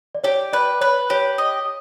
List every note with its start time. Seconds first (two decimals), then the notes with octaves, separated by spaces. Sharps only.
0.15 D5
0.24 G4 C#5
0.53 B4 D5
0.81 B4 C#5
1.10 G4 C#5
1.38 D#5